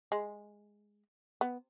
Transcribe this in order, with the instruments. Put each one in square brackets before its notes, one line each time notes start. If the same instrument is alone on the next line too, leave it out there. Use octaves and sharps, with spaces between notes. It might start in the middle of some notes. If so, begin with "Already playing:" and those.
[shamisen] G#3
B3